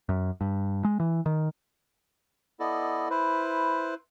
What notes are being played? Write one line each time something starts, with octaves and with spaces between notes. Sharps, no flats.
F#2
G2
G#3
E3
D#3
B3 E4 A4 D5 D#5
E4 B4 C5